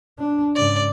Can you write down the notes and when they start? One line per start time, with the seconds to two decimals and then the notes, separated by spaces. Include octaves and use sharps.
0.19 D4
0.56 G#2 C#3 D5